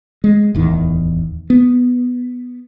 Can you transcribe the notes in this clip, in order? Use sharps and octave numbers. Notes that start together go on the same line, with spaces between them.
G#3
D1 E2 D#3
B3